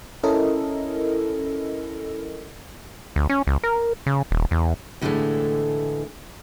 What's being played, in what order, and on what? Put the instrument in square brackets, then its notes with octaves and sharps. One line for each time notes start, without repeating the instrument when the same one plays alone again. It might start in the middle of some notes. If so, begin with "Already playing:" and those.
[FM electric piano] C#4 E4 A4 A#4 D#5
[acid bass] D2
C#4
C#2
A#4
C#3
D#1
E2
[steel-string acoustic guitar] A2 D3 E3 F#3 G#3 A3